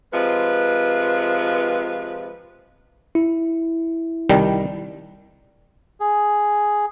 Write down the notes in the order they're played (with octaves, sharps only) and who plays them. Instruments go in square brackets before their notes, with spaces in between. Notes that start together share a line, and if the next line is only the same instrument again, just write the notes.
[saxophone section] C3 F3 G#3 B4
[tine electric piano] E4
[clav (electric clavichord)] C2 D#3 G3
[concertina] G#4